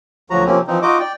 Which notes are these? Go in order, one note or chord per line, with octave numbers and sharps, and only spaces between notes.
D2 F3 F#3 F#4 A#5
C3 F3 A#3 C4 C#4
E3 F3 C4 D#4
D#4 F4 F#4 D#5 D6
D5 G5